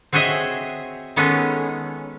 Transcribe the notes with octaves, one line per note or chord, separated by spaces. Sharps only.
C4 F#4 G#4 C#5 D#5 E5
D#3 G#3 B3 C#4 A4